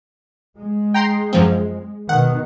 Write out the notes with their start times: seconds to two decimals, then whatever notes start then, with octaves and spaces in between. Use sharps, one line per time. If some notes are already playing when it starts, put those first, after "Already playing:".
0.58 G#3
0.94 G5 A#5 C6
1.33 F#2 F3 C4
2.09 B2 D#3 F#5